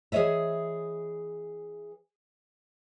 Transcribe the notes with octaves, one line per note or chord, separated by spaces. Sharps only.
E3 G#4 C5 C#5 D#5 E5